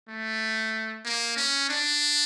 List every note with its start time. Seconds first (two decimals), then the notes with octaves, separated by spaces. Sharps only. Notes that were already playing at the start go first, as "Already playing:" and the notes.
0.08 A3
1.05 A#3
1.37 C#4
1.69 D4